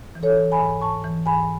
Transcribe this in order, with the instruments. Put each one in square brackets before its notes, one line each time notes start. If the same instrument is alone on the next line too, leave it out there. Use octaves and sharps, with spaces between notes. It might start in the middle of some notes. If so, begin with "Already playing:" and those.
[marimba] E3
A4 C#5
E3
G#5 B5
G#2
G#2 A5 C#6
E3
G#2 G#5 B5